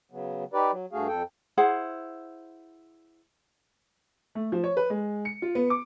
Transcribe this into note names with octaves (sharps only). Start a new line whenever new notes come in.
C#3 F#3 B3
D#4 G4 B4 D5
F#3
G2 A3 F#4 G#4 F5
F2 A4 G5
E4 G#4 C5 F#5
A3
F3
C#5
B4
G#3
C#7
F4
B3
D6